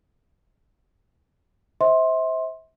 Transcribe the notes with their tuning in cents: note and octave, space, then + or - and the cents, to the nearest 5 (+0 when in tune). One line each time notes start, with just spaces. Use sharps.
C5 +0 E5 -35 C6 +15